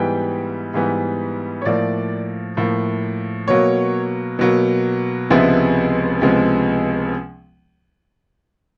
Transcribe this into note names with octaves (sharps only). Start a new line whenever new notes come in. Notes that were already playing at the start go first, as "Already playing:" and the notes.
Already playing: G#2 E3 G3 B3 G5
G#2 E3 G3 B3
C#5
A2 F3 A#3 D5
A2 F3 A#3
B2 F#3 A#3 C#5
B2 F#3 A#3
C#2 C3 F3 G#3 B3 E5
C#2 C3 F3 G#3 B3